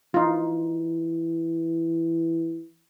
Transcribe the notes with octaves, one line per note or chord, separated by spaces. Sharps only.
E3 D#4 F4